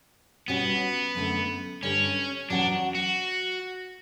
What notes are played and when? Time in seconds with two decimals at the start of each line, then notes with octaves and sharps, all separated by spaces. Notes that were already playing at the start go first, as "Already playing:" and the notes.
0.48 B2 G3 B3 C#4 F#4
1.15 F#2 D3 A3
1.83 G2 D3 G3 C#4
2.50 E2 B2 F#3 C#4 D4 F#4
2.95 F#4